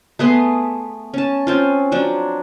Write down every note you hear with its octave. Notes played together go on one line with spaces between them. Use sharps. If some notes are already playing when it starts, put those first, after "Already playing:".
A3 B3 G#4 C6
C#4 A5
C4 C#4 F4
F3 F#3 D4